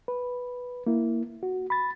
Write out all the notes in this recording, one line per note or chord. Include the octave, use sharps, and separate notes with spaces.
B4
A#3 E4
F#4
B5 A6